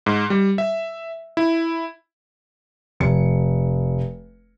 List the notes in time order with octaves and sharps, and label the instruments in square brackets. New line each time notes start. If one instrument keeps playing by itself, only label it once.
[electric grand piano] G#2
G3
E5
E4
[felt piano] F1 C#7